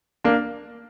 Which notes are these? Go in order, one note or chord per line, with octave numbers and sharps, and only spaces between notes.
A#3 D4